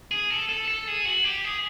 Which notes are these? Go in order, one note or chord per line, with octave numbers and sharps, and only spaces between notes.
G#4
A4
A4
A4
G#4
F#4
G4
G#4